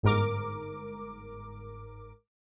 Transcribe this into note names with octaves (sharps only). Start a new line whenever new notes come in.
G1 G#2 A#4 D6